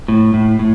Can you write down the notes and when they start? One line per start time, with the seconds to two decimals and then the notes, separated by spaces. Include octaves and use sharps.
0.08 A2
0.34 A2
0.59 A2